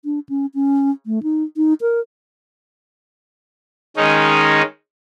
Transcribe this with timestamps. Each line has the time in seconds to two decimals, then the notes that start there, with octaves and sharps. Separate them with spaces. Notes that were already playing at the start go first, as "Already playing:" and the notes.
0.05 D4
0.29 C#4
0.55 C#4
1.06 A3
1.23 D#4
1.57 D#4
1.81 A#4
3.97 D#3 G#3 C#4 D#4